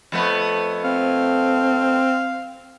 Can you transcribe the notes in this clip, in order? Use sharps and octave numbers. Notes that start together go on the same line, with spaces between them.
F2 A3 B3
C4 F5